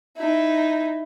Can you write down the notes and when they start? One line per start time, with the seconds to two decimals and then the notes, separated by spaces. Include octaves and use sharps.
0.17 D#4 E4